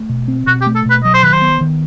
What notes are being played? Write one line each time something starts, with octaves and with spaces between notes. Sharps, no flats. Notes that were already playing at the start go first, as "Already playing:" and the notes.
Already playing: A3
B2
C4
B2 F#4
G4
A3
A4
B2 B4
F#3 D#5
C5
D#3 B4
C5
B3
D#3